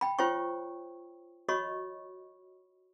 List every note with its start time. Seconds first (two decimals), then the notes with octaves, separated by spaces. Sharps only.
0.01 G5 B5
0.19 F4 C5 C#5 G5 C#6
1.49 F#4 C#5 D#5 B5 C#6